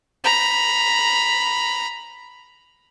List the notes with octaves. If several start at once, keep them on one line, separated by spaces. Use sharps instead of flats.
A#5 B5